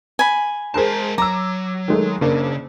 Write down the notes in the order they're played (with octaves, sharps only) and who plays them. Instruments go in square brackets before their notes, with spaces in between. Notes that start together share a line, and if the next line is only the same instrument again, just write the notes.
[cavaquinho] G#5 B5
[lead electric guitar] G#3 A5 [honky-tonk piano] G#4 A#4 C5
[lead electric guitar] F#3 [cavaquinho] A#5 [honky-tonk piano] D6 E6
[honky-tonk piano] D#3 G#3 A3
[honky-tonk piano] F#1 A#3 D4 [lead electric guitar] C#3